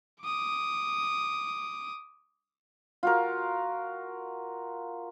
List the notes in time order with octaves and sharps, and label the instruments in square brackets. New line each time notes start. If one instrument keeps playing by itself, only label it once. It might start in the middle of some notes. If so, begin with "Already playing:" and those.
[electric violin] D6 D#6
[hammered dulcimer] F4 F#4 A#4